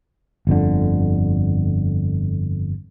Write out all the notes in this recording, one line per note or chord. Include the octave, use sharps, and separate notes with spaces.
G1 F2 D3